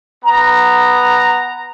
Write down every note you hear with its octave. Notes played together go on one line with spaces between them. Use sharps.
B3 A#5